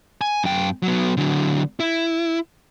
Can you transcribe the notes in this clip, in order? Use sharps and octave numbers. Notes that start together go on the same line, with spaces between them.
G#5
F#2 G5
F#3 B3
D3 F#3
E4